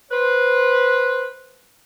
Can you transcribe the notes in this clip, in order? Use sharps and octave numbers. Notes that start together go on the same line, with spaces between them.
B4 C5